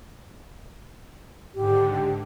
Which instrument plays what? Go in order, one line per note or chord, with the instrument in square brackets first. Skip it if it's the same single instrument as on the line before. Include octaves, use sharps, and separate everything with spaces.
[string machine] G#2 D3 [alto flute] G4